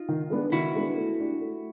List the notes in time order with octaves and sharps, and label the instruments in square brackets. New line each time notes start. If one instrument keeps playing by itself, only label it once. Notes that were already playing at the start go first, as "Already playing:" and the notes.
Already playing: [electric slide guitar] D#4 F4
[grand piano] D#3
G#3 B3 D4
[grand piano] D#3 [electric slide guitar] E4 F#4
[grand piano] G#3 B3 D4
A3
D4 G4
A3